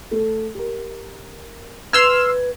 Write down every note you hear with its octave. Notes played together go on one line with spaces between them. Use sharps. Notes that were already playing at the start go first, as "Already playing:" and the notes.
A3 A4
G4 A#4
B4 C6 E6 F6 G#6